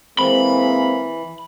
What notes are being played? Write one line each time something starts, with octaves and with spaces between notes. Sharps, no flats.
E3 G#3 A#3 C4 B5